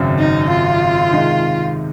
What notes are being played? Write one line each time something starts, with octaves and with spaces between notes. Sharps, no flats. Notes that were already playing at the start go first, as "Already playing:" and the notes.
Already playing: G#1 F#2 C#3 F#3 C4
D#4
F4
C3 D#3 G#3 D#4